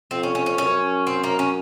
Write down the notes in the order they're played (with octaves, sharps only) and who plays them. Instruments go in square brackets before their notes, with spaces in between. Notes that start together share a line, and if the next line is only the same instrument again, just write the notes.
[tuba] F2 [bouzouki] C4
[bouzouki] C#4
C#4
C#4
[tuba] F#2 [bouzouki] C#4
[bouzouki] C4
A#3
C#4